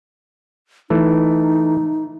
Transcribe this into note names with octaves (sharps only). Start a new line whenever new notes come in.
E3 A3 D#4